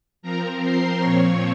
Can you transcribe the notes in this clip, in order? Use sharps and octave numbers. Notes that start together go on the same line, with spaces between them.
F3 C4 A#4 A#5
C5 C6
A#2 F3 C4 C#5 C#6